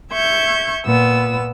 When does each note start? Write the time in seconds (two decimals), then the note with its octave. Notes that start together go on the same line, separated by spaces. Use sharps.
0.12 E5 C#6 G6 G#6
0.86 A#2 B3 E6